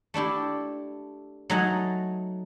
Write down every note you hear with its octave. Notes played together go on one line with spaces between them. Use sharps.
A3 D4 E4 G4
F#3 A3 D#4 F#5 G#5 A#5